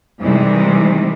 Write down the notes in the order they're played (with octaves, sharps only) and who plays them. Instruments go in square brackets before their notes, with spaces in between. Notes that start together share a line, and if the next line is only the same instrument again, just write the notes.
[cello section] C3 D#3 E3 G3 G#3